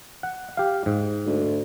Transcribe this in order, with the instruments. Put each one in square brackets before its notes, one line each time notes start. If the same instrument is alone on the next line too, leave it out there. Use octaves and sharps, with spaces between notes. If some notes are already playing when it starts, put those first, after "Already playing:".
[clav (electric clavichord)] F#5
G4 F5
G#2
[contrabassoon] D2